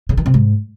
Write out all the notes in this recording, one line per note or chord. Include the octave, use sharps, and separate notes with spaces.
C#3
D#3
C3
G#2